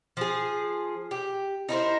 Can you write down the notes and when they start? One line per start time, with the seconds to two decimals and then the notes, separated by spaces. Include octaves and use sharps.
0.17 F3 G#4
1.11 G4
1.69 D#4 E4 A#4 C5